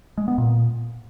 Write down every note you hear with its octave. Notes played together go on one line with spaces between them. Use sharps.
G#3
B3
A#2